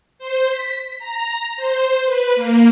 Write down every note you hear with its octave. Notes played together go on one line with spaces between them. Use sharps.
C5
B6
A#5
C5
B4
A#3